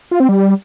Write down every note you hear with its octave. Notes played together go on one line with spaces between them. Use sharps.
F4
C4
G3